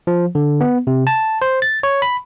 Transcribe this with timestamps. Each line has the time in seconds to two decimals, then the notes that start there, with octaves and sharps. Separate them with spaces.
0.07 F3
0.35 D3
0.61 B3
0.87 C3
1.07 A5
1.42 C5
1.62 A6
1.83 C#5
2.02 B5